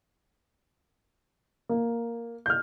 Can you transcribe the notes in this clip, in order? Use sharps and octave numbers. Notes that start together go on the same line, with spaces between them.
A#3
F6 G6